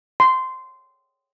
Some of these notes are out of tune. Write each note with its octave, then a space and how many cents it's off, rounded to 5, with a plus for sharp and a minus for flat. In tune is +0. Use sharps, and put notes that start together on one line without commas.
C6 -15